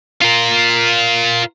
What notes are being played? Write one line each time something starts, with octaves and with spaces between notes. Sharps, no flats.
F4 A#4